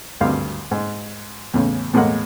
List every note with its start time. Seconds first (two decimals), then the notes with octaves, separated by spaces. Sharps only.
0.21 G#1 D2 G2 F5
0.71 G#2
1.54 E2 A2 C#3
1.93 E2 A2 G#3 A#3 F#5